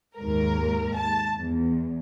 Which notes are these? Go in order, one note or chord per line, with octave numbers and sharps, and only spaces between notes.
D#2 G#2 A#4
A5
E2